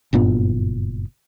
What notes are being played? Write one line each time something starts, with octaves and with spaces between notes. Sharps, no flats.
F#1 G2 A#2 B3